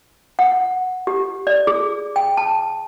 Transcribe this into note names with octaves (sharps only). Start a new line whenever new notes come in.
F#5
G4
D5
G#4
G5
A5